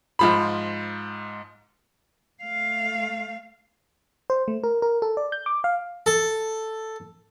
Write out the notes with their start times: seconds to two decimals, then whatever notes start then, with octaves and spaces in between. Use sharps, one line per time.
0.19 G#2 F3 B5
2.43 A3 F5
4.30 C5
4.48 A3
4.64 A#4
4.82 A#4
5.02 A4
5.17 D5
5.32 G6
5.46 D6
5.64 F5
6.06 A4